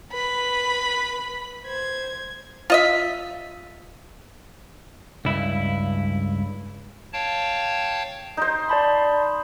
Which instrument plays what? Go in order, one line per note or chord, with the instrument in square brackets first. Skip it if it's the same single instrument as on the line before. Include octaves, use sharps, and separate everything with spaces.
[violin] B4 B5
C5 G#6
[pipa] F4 D#5 E5
[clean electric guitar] C#2 G2 E4
[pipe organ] C#5 F5 G5 A5
[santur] D#4 C5
[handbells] D5 A5 B5